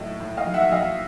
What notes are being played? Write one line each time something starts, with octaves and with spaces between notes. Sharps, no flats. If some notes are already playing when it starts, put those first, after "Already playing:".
Already playing: A2 F#3 D#5
A2
D#5 F5
F#3
E5 F#5
F#3 D#5 F5